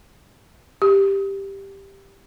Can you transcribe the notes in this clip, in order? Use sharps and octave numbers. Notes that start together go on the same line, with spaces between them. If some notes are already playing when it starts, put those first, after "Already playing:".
G4